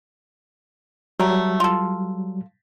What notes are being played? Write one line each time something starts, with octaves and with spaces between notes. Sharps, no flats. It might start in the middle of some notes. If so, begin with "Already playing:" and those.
F#3 G3 A3 A#4
F4 A4